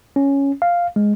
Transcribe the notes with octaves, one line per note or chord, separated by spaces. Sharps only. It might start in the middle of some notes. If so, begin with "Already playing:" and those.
C#4
F5
G#3